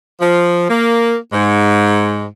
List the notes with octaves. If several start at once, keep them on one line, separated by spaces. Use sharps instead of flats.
F3
A#3
G#2